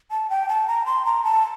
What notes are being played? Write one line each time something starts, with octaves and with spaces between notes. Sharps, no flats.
A5
G5
A5
A#5
C6
A#5
A5